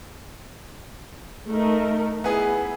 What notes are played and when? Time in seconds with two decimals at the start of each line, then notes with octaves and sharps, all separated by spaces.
1.50 A3 D#4 A#4
2.24 B3 E4 G#4